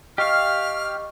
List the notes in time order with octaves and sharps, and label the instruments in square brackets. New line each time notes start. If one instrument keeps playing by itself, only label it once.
[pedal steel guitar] G4 F5 [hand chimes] D#5 C#6 [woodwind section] F6